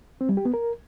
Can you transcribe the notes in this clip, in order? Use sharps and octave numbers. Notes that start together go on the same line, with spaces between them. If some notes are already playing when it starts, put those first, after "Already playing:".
C4
G3
G4
B3
A#4